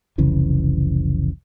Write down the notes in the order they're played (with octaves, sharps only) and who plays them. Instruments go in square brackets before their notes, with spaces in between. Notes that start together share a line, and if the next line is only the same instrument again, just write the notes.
[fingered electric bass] F1 C2 C#3 E3